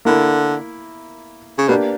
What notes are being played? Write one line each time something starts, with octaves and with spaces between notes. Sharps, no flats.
D3 A#3 E4 A#4
C#3
B2 A#3 D4 G4 B4